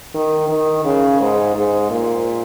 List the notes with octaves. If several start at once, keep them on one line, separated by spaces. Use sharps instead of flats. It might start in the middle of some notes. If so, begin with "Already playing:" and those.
D#3
D#3
C#3
G#2
G#2
A#2